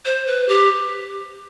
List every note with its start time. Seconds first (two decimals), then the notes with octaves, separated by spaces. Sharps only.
0.05 C5
0.27 B4
0.49 G4